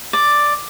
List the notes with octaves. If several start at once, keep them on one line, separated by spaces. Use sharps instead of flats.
D5